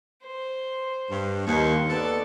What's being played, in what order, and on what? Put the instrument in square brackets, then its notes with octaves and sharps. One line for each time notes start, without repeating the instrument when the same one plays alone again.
[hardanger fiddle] C5
[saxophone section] G2
[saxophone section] D#2 [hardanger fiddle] C6 C#6
[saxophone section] B3 A4 [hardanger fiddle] D5